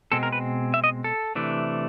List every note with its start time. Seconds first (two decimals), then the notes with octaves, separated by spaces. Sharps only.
0.12 B2 G#3 C4 A4
0.23 A#4
0.32 B4
0.74 E5
0.84 D#5
1.04 A4
1.35 C3 E3 A3 D4